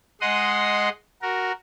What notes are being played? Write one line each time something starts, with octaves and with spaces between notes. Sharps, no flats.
G#3 D#5 F#5 C6 D#6
F#4 A#4